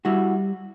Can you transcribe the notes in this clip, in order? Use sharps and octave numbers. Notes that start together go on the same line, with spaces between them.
G3 E4 F#4